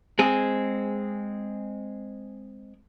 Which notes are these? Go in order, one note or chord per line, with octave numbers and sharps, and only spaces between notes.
G#3 C4 G#4